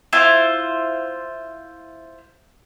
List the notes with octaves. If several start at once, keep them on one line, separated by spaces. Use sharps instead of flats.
E4 F4 C5